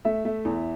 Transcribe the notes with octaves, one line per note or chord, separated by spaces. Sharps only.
A3 E5
A3
E2